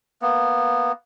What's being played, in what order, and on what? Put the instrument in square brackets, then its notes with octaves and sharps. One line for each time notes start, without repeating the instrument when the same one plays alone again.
[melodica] A#3 B3